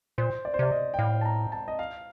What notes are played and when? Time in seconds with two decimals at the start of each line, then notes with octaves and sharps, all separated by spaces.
0.18 A#2 C5
0.45 D5
0.54 C5
0.59 C3 D5
0.72 D#5
0.94 G5
0.98 A2 F5
1.21 A5
1.25 A#5
1.52 A5
1.68 D#5
1.79 F5